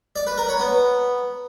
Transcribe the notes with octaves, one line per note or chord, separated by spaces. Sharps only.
D5
B4
A#4
C#5
B3